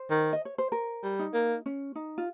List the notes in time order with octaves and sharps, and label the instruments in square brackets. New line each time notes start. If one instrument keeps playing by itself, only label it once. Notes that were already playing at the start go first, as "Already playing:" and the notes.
Already playing: [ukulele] C5
[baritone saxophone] D#3
[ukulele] D#5
C#5
C5
A#4
[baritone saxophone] G3
[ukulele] D#4
[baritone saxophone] A#3
[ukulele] C#4
D#4
F4